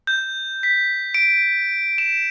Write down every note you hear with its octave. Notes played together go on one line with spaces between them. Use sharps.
G6
B6
D7
E7